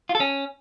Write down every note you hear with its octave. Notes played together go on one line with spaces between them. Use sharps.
F4
A4
C#4